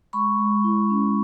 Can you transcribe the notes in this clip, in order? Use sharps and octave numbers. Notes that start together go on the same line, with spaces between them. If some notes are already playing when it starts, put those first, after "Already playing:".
G#3 B5 C#6
G#3
E4
C#4